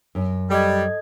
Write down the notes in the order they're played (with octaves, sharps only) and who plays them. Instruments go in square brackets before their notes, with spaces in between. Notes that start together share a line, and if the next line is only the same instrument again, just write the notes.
[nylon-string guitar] F#2
[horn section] G3 [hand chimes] A4 D#5 G#6